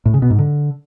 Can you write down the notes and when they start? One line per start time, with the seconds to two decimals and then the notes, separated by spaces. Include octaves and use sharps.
0.05 A2
0.14 C#3
0.22 B2
0.30 G#2
0.39 D3